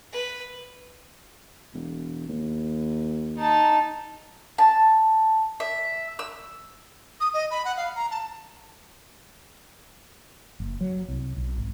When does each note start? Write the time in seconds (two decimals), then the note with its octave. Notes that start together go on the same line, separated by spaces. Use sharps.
0.12 B4
1.74 E1
2.28 D#2
3.39 D#4 A5
4.58 A5
5.60 E5
6.19 E6
7.21 D#6
7.34 D#5
7.51 B5
7.65 F#5
7.77 F5
7.96 A#5
8.11 A5
10.60 F#1
10.81 F#3
11.08 C2
11.37 B1
11.58 G#1